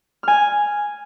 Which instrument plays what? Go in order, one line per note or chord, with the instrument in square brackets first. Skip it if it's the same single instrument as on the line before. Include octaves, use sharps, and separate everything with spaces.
[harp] G#5 F6